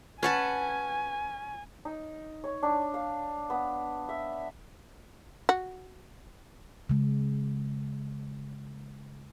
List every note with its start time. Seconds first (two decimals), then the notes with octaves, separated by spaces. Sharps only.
0.23 C#4 B4 F#5 G#5 A5
1.85 D#4
2.44 C#5
2.63 D4
2.94 F5
3.50 B3
4.09 E5
5.49 F#4
6.89 C#3 G#3